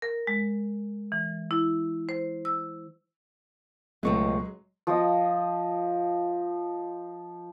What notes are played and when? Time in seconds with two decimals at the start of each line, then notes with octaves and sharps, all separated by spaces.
0.02 A#4
0.27 G#3
1.12 E3
1.51 E4
2.09 C5
2.45 E6
4.03 C#2 B2 F#3 G#3 A3 C4 E5 C#6
4.87 F3 D#5